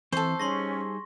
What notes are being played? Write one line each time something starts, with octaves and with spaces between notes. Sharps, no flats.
E3 C4 A4 C5 C#6
G3 C#4 D#4 G#4 C6 C#6 A#6